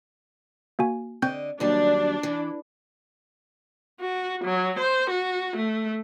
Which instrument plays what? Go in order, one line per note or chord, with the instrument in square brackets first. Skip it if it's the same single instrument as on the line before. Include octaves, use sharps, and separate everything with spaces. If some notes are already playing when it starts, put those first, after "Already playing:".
[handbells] A#3 F#4 G#5
[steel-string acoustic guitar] D3 D#5 [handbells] C4 G6
[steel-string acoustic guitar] D#2 F#3 G3 [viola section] D4
[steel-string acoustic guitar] E3
[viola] F#4
F#3
C5
F#4
A3